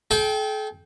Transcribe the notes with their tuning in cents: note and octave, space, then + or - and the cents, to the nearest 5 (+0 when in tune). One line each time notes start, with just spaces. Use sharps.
A4 -45 G5 +0